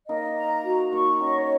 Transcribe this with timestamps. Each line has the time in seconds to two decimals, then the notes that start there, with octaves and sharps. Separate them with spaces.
0.09 A#3 D#4 D#5
0.37 A#5
0.65 F#4
0.93 A#3 D#4 C#6
1.20 C#4 F#4 D#5
1.38 C#5